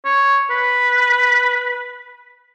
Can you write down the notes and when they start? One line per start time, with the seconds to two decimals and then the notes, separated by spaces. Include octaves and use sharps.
0.05 C#5
0.50 B4